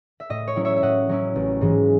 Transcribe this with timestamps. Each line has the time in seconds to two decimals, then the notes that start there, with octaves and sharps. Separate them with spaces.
0.20 E5
0.30 A2 D#5
0.47 C#5
0.56 F#3 C#4 E4
0.65 C#5 E5
0.76 E5
0.82 A2 D#5 F#5
1.09 F#3 C#4 E4
1.36 A1
1.61 G#2 E3 G#3